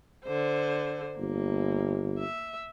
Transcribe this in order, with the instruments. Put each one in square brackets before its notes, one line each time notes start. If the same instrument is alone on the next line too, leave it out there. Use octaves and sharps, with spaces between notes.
[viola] D3 C5
[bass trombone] G1 [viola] A#3
[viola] E5